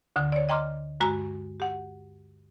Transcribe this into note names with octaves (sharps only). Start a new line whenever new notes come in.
D2 D3 D#6
C#5 D5
D#5 G5 A#5 C6 D6 F6
G2 G#3 F#4 A#5
G4 F#5